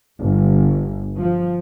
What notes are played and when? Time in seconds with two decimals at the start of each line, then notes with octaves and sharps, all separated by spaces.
0.19 G1
1.17 F3